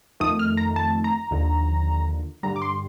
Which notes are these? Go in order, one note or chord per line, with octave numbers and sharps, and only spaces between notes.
F2 D#3 A3 D#6
F6
A#5
A5
A#5
D#2 D3 F3
G2 D3 G3 A#5
D6
C6